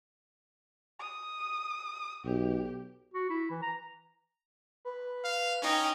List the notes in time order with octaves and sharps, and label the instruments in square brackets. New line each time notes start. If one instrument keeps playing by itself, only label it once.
[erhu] D#6
[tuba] B1 [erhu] G4
[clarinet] F#4
E4
E3
A#5
[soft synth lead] B4
[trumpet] F5
[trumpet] C#4 [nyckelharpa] D#4 G5